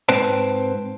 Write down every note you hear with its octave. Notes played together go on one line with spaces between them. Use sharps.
G#2 C4 B4 C5 G5 A5